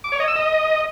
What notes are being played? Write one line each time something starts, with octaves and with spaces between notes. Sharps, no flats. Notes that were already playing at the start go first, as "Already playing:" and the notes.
D6
C#5
D#5
E6
D#5